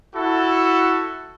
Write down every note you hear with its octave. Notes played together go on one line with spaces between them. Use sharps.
E4 F#4 A4